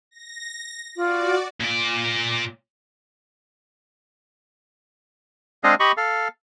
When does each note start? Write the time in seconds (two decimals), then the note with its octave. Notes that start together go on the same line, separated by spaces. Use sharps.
0.11 A#6
0.96 F4 F#4 D5
1.61 A#2 D5
5.64 G#3 C4 D4 G#4 D#5 F5
5.80 G4 D#5 B5 C#6
5.97 A4 F5